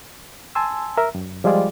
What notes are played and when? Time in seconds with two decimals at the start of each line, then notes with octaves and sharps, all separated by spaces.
0.55 G#5 A5 C6 E6
0.97 A#4 E5
1.15 F#2
1.44 F3 G3 G#3 F4 G#4 D5